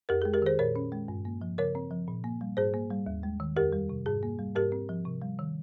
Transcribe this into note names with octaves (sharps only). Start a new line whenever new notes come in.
F2 G4 A#4
G#4
G#3
G4 A#4
D#3 G#4 C5
A#2 A#4 C#5
C#4
G#3
G2
A#3
F3
C#3 A#4 C#5
C4
F3
A#2
A#3
G3
G#2 G#4 C5
A#3
G3
D#2
G#3
D#3
F2 G4 A#4
G3
C3
G#2 G#4
A#3
G3
G#2 G4 A#4
C4
F3
C3
G3
D#3